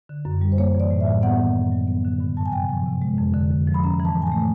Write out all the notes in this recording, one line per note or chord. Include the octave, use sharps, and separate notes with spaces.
D3
F#2
G3
C5
A#3 C#5
E3
D5
A2
E5
G3
B3 F#5
D#3
F#2
F#3
B3
D3
G2
F#3 A5
G#5
C3 G5
F3
C3
G#3
F2
D3
F2
F3
B5
C#4 A#5
E3
A5
A2
G#5
A3 A5